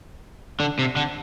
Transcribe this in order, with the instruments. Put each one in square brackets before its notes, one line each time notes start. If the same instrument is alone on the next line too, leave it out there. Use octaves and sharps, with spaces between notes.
[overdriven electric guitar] D3
C3
D3